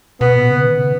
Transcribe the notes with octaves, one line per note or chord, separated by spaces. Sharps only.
B2 B3
A#2
C#3
D#3
C#3